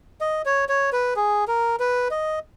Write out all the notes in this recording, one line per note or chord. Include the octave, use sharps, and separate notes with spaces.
D#5
C#5
C#5
B4
G#4
A#4
B4
D#5